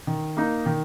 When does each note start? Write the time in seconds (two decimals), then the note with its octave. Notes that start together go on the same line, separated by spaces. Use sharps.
0.07 D#3
0.37 A#3 D#4
0.66 D#3